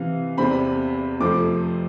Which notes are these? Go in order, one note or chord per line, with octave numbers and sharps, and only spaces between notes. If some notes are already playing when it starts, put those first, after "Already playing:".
Already playing: C3 E3 F5
E2 C3 G3 C4 B5
F2 C3 F3 A3 C4 D6